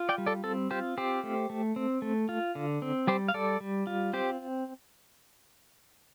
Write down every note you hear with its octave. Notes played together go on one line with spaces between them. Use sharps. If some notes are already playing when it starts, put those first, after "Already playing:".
Already playing: F4
D5 G5
G3
A4 D5
C4 A4
F4 G4 C5
C4 G4 C5
A3
A3
C4
A3
F4
D3
C4
G3 G4 C5
F5
G3 A4 D5
G3
F4
C4 G4 C5